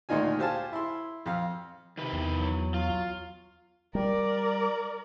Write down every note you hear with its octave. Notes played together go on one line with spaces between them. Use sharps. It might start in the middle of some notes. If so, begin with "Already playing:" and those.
D2 A#2 D#3 D#4 F4 G#5
G4 C5 F5 G#5 A5
E4 C6
F2 F5
C3 D#3 B4
E2
F#3
F#3 F4
G3 A#4 D5